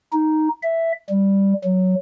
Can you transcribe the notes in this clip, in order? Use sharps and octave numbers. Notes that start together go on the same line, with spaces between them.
D#4
E5
G3
F#3